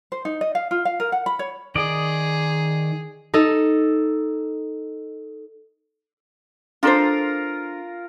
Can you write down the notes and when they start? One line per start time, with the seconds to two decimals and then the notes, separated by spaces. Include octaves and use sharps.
0.12 C5
0.25 D#4
0.41 D#5
0.55 F5
0.71 F4
0.85 F5
1.00 A#4
1.12 F#5
1.26 B5
1.39 C#5
1.75 D#3 G#4 D5 D#5
3.34 D#4 A4 D#5
6.83 D4 F4 A4 A#4 C5